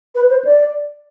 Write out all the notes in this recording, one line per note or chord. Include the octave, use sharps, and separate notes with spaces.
B4
C5
D5